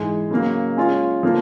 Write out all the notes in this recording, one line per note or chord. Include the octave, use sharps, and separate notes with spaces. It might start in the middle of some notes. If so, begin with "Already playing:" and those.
Already playing: G#2 E3 G#3
C#3 F#3 A#3
G#3 C#4 F4
D3 F3 A#3